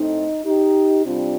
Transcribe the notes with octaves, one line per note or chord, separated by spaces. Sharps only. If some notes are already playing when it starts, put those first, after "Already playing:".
Already playing: A2 A3 C4 D#4
D#4 G4
C3 G3 C4 D4 F4